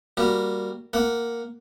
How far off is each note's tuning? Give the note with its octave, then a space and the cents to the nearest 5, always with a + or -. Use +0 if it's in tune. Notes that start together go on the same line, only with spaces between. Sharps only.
G3 +0 A#3 +0 F#4 +0
A#3 +0 F#5 +0